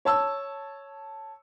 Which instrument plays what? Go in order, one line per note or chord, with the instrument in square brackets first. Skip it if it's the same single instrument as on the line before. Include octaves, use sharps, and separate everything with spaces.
[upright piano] C#5 A5 E6